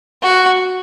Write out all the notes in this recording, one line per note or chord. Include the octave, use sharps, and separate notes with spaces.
F#4